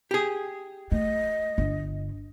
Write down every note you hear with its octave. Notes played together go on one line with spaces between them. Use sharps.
G4 G#4
A3 D#5
G1